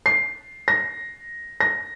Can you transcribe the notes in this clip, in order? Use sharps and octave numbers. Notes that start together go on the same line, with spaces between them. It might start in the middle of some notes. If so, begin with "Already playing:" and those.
C7
A#6
A#6